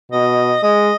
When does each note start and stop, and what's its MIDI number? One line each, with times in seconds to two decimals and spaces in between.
0.12 0.55 47
0.12 0.62 75
0.63 0.91 56
0.63 0.96 75